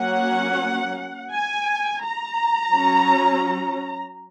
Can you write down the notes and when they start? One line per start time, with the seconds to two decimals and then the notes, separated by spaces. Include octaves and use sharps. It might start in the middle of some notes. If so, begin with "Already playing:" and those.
Already playing: F#3 A#3 C#4 F#5
1.32 G#5
2.04 A#5
2.75 F#3 C#4